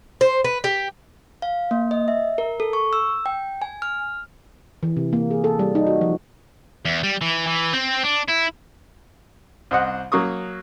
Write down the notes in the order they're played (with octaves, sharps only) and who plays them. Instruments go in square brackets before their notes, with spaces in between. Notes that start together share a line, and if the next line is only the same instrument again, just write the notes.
[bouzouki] C5
B4
G4
[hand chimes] F5
A#3
D#5
E5
A#4
A4
C#6
E6
G5
G#5
F6
[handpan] E3
C3
A#3
G#4
A4
G3
D#4
F#4
F3
[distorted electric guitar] E2
G3
E3
E3
C4
D4
E4
[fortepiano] C2 C5 D#5 F#5
F#3 A#3 C#6 D#6